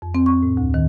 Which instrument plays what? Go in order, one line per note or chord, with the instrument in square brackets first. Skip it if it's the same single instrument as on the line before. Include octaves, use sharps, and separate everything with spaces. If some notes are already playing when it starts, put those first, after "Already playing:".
[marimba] F2
C4
C#6
A2
D2
D#3